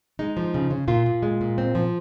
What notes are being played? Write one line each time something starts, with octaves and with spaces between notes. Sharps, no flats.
G#3 D#4
F3
C#3
C#3
A#2 F4
A#2
G#3
A#2
C4
F3